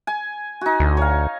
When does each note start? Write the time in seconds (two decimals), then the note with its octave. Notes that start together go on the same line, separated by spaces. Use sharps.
0.07 G#5
0.61 D#4 F#4
0.80 D2
0.97 C#5 F5